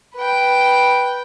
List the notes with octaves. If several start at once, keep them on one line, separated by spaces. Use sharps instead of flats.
B4 G5